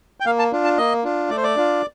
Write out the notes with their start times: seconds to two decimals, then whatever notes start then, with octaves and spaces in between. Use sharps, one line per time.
0.20 G5
0.26 A#3 F5
0.39 A5
0.52 D4 F4
0.64 A5
0.78 A#3 D#5
1.04 D4 F4
1.30 A3 D5
1.37 C5
1.43 D5
1.56 D4 F4